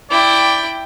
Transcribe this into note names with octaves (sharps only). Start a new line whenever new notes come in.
E4 D5 G5